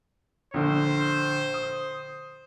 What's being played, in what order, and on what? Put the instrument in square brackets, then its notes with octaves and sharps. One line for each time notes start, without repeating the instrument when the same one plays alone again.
[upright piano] A#1 D3 [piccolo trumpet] C5
[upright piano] D#6